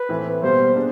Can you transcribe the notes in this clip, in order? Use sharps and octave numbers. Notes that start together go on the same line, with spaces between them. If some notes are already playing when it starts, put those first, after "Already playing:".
Already playing: B4
A2 E3 A3 C4
B2 G3 A#3 C5
G#3 B3 D4